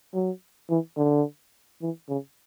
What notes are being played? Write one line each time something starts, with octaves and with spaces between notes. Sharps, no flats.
F#3
E3
D3
E3
C#3